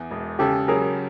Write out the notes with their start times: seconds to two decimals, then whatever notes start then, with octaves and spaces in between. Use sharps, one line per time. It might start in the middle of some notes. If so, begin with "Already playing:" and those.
Already playing: E2
0.11 E1
0.39 C#3 G4 A4
0.68 F#3 G#4 A#4